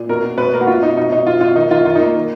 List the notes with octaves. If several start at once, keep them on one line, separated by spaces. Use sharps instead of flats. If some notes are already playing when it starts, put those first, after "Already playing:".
Already playing: A#2
B2 A#4
B2
B2 B4
A#3 A#4
F#4
B2 F4
B2 D#4
B2 D#4
B2 D#4
B2 F4
B2 F4
D#3 D#4
D#3 F4
D#3 F4
D#4
A#3
D#3